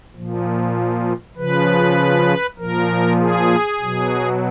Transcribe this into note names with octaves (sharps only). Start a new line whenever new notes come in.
A#2 F3
C#3 F3 B4
A#2 F3 A#4
G#4
B2 F#3